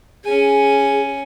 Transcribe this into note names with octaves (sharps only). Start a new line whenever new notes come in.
C#4 G#4 G#5